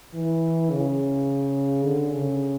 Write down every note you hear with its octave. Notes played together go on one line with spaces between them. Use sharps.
E3
C#3
D3
C#3